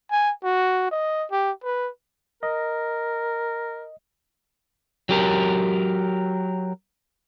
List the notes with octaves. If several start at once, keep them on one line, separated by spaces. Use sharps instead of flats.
G#5
F#4
D#5
G4
B4
A#4 D#5
F#3 G4 A#4